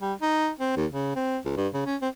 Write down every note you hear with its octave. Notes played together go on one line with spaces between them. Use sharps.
G3
D#4
C4
D#2
C#3
C4
C#2
G2
C#3
C#4
C4